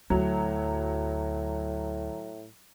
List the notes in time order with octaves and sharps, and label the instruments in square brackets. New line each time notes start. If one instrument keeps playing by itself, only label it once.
[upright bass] D2 [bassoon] A2 [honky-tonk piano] F#3